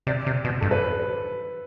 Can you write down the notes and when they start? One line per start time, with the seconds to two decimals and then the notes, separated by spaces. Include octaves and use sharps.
0.07 C3 D5
0.26 C3
0.44 B2
0.61 G2 A4
0.71 B4
0.81 C5